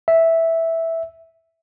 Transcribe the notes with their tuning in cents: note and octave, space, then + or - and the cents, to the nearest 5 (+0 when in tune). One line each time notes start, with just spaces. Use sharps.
E5 -5